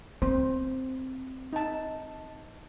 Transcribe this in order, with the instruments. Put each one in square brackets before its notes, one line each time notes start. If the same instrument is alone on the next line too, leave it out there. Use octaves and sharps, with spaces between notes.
[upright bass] C4 [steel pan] C5
[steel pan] D#4 A5